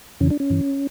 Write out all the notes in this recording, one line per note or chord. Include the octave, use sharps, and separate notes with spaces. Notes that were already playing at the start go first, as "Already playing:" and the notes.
F2 C#3 E3 C#4
D4
C#4
G2 E3